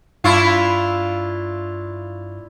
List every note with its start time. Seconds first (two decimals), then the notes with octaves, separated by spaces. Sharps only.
0.24 G2 D4 E4 F4 C#6